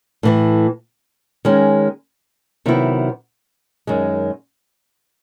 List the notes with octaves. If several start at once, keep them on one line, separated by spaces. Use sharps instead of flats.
A2 E3 A3
D#3 G#3 C#4
C3 D#3 F#3 B3 E4
F#2 D#3 G#3